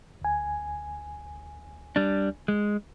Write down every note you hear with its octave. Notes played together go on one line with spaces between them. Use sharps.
D2 G#5
G3 D4
G#3